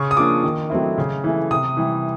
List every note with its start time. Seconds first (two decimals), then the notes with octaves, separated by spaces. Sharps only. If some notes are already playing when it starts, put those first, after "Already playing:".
Already playing: C#3 C#6
0.11 D#6
0.17 F3 A#3 D4 D6
0.44 D#3
0.70 F#3 A3 C4 E4
0.98 C#3
1.24 E3 A3
1.51 C3 D#6
1.77 E3 G3